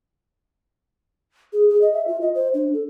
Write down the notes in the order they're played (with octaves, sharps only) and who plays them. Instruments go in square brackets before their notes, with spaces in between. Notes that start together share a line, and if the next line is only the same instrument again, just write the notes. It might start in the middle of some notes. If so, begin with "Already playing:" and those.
[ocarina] G#4
G#4
D#5
E5
F4
D#5
C5
D4
A4